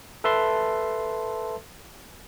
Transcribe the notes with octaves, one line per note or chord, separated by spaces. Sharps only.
A4 B4 E5 A5 C6